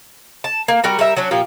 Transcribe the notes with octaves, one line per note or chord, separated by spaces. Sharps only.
A5
A#3
G3 F#4 A#4
G3 A#4 E5
F#3 C#4 D4
A#2 F3 G4